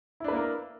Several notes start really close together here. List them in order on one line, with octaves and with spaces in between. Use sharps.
E4 D4 B4 A#3 A#4